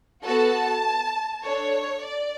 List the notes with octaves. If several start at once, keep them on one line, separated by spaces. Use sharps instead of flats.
B3 F#4 A4 A5
D4 A4 C#5
D5